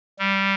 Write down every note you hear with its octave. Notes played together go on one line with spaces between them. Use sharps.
G3